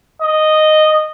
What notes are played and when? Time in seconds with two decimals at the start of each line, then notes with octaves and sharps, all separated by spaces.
0.22 D#5